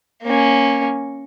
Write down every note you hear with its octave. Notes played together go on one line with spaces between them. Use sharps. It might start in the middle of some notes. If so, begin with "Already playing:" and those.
A#3 C#4